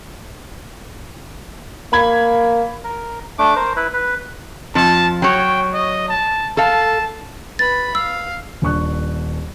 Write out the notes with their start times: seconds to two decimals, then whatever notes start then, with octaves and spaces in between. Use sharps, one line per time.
1.93 A#3 B5 G#6
2.84 A#4
3.38 A3 D4 D6
3.56 A#4 C5
3.76 E4 B4
3.93 B4
4.75 F2 F3 A5
5.22 F#3 C#5 G5
5.74 D#5
6.09 A5
6.57 A4 F5 A5
7.59 B4 B5 A6
7.95 F5 E6
8.62 D#1 D4 C#6 F#6